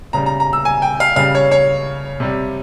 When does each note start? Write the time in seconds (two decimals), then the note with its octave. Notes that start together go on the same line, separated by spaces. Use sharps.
0.13 C#3 G3 A#5
0.26 A#5
0.40 A#5
0.53 E6
0.65 G#5
0.82 G5
1.00 F5
1.16 C#3 G3 F5
1.35 C#5
1.51 C#5
2.20 C3 G3